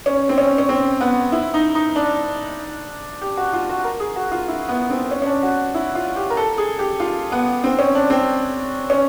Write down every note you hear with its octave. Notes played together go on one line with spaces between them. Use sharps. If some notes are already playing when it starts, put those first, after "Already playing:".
C#4
C4
C#4
C#4
C4
B3
E4
D#4
D#4
D4
G4
F#4
F4
F#4
A#4
G#4
F#4
F4
E4
B3
C4
C#4
C#4
D4
F#4
E4
F4
G4
A#4
A4
G#4
G4
F4
B3
C4
C#4
D4
C4
C#4